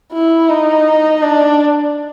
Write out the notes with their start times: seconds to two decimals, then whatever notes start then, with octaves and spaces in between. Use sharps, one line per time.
0.13 E4
0.50 D#4
1.23 D4